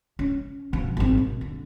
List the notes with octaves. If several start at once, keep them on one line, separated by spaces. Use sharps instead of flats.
C#4
B2 F3
G#1 C4
B2
D3